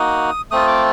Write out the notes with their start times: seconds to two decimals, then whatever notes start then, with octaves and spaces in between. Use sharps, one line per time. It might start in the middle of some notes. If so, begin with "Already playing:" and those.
Already playing: A#3 D#4 F#4 D#6
0.51 A3 C4 F4 D#6
0.68 D6